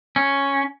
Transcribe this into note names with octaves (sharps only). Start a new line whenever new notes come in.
C#4